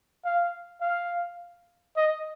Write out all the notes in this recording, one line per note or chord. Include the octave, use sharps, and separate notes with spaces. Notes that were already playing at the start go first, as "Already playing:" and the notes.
F5
F5
D#5